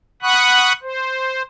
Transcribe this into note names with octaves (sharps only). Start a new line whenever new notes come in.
F#5 B5 C#6 D#6 F#6
C5